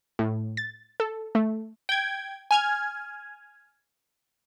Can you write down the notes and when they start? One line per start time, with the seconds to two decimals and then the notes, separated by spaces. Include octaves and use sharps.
0.19 A2
0.57 A6
1.00 A4
1.35 A3
1.89 G5 G#6
2.51 G#5 F6 G#6